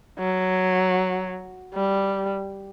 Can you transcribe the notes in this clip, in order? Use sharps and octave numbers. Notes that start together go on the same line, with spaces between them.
F#3
G3